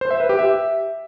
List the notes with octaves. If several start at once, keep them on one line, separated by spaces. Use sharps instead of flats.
C5
E5
B4
G4
E5